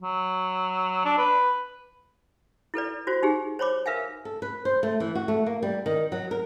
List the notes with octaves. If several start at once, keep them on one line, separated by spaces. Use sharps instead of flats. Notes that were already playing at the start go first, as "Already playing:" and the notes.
F#3
D4
B4
E4 A4 B4 D5
F4 F#4 C5
D#4 G4 G#4
C5 C#5 B5 D6
A#4 B4 E5 F5 G#5
A4
B4
C5
A3
E3
F#4
A3
A#3
G3
D#3
F#3
A#4